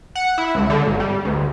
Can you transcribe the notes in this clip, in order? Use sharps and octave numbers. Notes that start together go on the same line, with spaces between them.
F#5
E4
C#2
D3
G#1
G3
D2